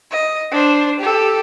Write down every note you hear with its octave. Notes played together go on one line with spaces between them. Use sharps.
D#5
D4 C5
G4 A4